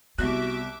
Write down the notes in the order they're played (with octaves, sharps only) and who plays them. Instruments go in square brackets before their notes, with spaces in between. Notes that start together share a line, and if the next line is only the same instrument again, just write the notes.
[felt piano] C2 F#6 [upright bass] B3 [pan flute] F#4 [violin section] E5 D6